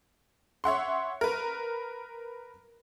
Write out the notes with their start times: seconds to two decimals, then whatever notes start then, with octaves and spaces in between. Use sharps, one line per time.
0.64 C#5 E5 F#5 C6
1.21 A#4 B4